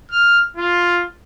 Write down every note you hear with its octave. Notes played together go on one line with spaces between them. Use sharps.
F6
F4